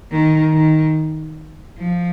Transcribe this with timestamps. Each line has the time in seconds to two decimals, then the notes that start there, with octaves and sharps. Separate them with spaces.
0.11 D#3
0.53 D#3
1.78 F3